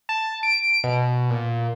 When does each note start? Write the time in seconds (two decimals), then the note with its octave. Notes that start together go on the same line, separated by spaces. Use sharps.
0.09 A5
0.43 D7
0.84 B2
1.30 A#2